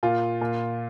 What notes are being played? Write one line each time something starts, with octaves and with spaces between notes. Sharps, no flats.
A#2 F4
A#2